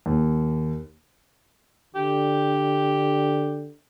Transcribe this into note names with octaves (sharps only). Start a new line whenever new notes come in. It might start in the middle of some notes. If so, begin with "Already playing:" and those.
D#2
D3 G4